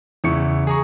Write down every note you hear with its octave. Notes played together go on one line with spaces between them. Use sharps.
E2 C#3 E4 C#6 C#7
G#4 A#5 C#6